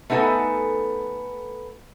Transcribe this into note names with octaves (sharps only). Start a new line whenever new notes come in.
A3 B3 D#4 A4 G#5